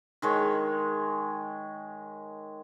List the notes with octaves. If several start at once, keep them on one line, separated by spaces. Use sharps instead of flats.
D#3 G#3 C#5